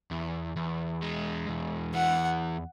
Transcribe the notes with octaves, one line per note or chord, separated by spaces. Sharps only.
E2
E2
G#3
E2
E3 F#5